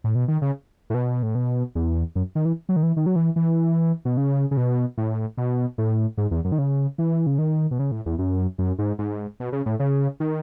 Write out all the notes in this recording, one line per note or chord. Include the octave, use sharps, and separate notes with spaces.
A2
B2
D#3
C#3
A2
B2
A2
B2
E2
F#2
D#3
E3
F#3
D#3
E3
D#3
F#3
E3
E3
B2
C#3
C#3
B2
A2
B2
A2
G#2
E2
F#2
D#3
C#3
E3
C#3
D#3
B2
C#3
A2
E2
F#2
F#2
G#2
G#2
B2
C#3
A2
C#3
D#3